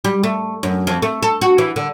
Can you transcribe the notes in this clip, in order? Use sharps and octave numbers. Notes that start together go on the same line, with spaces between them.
G3
A3
F#2
F2
A3
A4
F#4
E3
D3